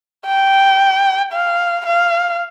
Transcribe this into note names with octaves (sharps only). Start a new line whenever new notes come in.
G5
F5
F5